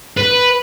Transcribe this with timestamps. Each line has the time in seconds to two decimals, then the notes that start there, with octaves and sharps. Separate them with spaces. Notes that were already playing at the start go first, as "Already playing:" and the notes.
0.17 B4